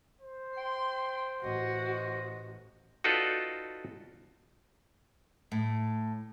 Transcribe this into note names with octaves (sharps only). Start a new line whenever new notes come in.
C5
G5 C6
A1 F#4 D#5
D#4 F4 F#4 A4 B4 D5
A2